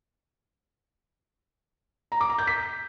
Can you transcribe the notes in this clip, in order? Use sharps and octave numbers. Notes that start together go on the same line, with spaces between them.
A#5
D6
A#5
G6
B6